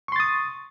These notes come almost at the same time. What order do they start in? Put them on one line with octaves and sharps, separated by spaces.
C#6 C6 A6 D#6